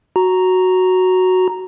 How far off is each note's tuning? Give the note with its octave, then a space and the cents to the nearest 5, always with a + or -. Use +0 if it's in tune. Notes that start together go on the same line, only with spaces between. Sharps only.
F#4 +0 A#5 +0